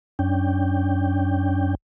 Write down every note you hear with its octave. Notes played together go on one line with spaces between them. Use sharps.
F#2 C#4 D4 G5